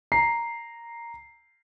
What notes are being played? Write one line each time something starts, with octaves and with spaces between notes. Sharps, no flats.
A#5 C7